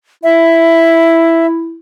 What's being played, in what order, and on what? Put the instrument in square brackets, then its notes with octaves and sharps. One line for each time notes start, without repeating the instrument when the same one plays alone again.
[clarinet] E4 [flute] E5